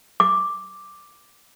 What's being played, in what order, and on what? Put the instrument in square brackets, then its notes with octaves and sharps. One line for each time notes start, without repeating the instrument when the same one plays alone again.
[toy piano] D6